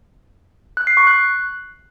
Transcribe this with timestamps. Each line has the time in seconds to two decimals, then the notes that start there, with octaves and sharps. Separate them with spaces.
0.77 F#6
0.87 C7
0.97 C#6
1.07 F#6